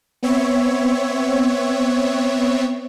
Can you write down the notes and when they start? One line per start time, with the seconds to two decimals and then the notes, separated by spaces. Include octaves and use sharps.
0.23 B3 C4 C#5 E5